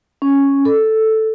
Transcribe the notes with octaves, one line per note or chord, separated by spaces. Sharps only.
C#4
A4